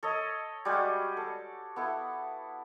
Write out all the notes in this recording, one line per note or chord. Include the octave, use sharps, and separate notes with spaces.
A4 C#5 D#5
G3 G#3 F#4 G4
A4
B3 E4 A4